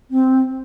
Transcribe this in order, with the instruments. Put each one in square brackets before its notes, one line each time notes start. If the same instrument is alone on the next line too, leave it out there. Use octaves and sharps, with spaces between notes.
[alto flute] C4